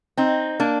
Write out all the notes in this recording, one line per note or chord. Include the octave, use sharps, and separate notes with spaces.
C4 D#4
A#3 D4